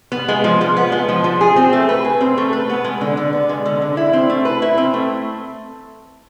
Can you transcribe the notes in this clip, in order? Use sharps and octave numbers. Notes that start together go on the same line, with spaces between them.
B3
G#3
F3
F3
B3
G#3
F3
F3
G#4
C4
A3
B4
G#4
C4
A3
B4
B3
G#3
D3
D3
B3
G#3
D3
D3
E4
C4
A3
B4
E4
C4
A3